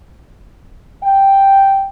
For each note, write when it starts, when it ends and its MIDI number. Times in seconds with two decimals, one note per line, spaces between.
1.04 1.86 79